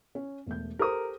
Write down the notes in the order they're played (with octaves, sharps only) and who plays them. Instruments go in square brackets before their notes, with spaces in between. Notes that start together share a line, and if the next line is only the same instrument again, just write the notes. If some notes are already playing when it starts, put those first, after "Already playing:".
[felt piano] C#4
E1 A3 G6
[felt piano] G4 A4 C5 [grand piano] A#4 D#6